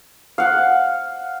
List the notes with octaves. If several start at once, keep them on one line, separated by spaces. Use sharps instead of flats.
F5 F#5